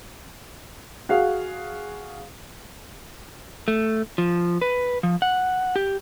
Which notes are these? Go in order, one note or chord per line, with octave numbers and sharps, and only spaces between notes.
F#4 G#4 F5
A3
F3
B4
F3
F#5
G4